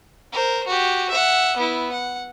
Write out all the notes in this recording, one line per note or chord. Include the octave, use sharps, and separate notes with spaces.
A#4 C5
F#4 G4
E5 F#5
B3 E4
F#5